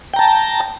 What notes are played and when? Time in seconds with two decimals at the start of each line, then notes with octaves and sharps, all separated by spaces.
0.14 G5
0.16 A#5
0.19 A5